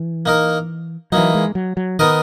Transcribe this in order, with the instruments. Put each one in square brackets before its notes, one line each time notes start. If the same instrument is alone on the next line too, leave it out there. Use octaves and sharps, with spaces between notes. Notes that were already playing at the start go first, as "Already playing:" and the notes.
Already playing: [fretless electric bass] E3
[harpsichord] A#3 D#4 A#4
[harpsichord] E3 A#3 D#4 [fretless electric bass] F#3
[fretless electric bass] G#3
F#3
F#3
[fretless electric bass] D#3 [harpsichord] B3 D#4 A#4 D#5